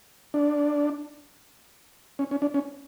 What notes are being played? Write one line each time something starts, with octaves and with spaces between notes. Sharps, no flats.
D4
C#4
C#4
D4
C#4